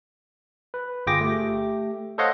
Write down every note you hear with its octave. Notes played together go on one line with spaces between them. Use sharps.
B4
G1 F4 G#4 G5 D6 A#6
A3 G4
A4 C5 C#5 D#5 F5 F#5